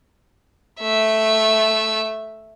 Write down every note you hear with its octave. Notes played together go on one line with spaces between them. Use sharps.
A3 E5